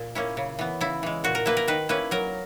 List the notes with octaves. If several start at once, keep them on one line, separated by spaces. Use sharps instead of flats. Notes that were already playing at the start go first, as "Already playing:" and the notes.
Already playing: A#2
A#3 C#4 E4
C#3
E3 B3
C#3 E4
E3 G#3
A#2 F#4
A#4
A#3 E4 B4
A#4
D#3 B4
A#3 C#4 E4 B4
F#3 A#4